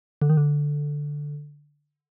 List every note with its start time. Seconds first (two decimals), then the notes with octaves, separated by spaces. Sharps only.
0.22 D3
0.29 D#3
0.37 D3